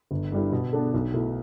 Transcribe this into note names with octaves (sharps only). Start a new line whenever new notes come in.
G1
G2 D3 G3 E4
B2
B3 D4 A4
B1
B2 A3 E4